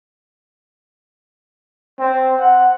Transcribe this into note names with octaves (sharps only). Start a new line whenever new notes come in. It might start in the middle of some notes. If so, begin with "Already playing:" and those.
C4
F#5